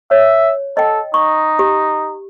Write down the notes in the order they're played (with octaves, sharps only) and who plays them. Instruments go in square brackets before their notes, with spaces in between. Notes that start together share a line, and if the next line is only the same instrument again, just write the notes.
[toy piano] C#5 [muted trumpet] E5
[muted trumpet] A4 [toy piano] D#5 G5
[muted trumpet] D#4 [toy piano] C#6
[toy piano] G4